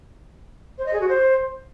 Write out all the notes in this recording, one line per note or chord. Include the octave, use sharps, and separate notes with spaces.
C5
D#5
G#4
F#4
C5